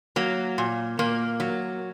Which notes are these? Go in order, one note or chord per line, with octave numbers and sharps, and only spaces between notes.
F#3 A#3
A#2
A#2 A#3
F#3